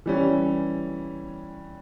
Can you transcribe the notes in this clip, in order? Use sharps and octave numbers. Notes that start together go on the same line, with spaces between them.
E3 G3 C#4